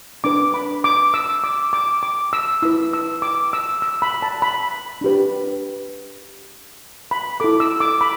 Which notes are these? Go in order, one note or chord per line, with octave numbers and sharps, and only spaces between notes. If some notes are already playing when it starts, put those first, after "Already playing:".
D4 B4 D6
B5
D6
E6
D6
D6
D6
E6
E4 B4 E6
E6
D6
E6
E6
B5
A5
B5
D4 G4 B4
B5
E4 A4 D6
E6
D6
B5